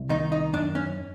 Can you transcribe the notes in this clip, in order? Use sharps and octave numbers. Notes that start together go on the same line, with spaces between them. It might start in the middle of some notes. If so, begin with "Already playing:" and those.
Already playing: C2
D#3 D#4
D#4
F#2 D4
C#4